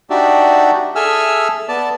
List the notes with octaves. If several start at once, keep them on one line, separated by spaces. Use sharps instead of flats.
D4 D#4 F#4 G4 D5 E5
G#4 A4 E5 G#5 E6 F6
B3 D5 A5